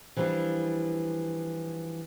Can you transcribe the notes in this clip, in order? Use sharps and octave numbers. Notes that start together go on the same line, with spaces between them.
E3 F3 G3 D4